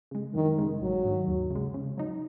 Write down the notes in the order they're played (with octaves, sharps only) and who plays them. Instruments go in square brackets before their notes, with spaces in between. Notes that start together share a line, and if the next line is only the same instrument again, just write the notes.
[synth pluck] C#3 G#3
[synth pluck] F#2 [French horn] D#3
[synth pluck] C#3 G#3
[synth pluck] A#1 [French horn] F#3
[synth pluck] G#2 D#3
D#2
C#3 G#3
C#3
F#3 D#4